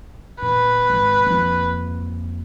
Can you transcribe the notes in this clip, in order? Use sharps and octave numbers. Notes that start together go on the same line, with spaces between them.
A#2 B4
G#1
F2 A#3